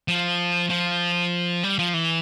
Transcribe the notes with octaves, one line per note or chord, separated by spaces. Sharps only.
F3
F3
G3
F3
E3